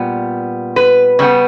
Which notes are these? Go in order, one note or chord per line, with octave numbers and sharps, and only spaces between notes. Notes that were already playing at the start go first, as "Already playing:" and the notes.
Already playing: A#2 G3 B3
B4
C#3 G3 B3